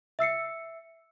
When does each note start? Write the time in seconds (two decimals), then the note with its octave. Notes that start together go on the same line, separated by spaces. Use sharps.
0.19 E5 E6 C7 C#7